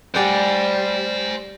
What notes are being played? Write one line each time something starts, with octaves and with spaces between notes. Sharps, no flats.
G3 G4 C5 D5 F#5 G#5